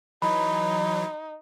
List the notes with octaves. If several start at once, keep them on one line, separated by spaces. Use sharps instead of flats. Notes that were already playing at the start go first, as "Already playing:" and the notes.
E3 F#3 D#4 B5